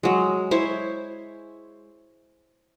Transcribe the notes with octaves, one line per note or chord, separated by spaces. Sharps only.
F#3 G#3
E4 C5 C#5